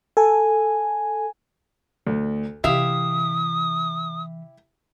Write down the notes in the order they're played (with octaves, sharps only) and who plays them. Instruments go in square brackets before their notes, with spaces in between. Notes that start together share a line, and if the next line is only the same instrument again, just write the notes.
[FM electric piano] A4 [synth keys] G#5
[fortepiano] D2 [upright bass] D3
[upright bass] C3 E3 [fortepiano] E4 G4 [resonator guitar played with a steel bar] E5 F5 [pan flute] D#6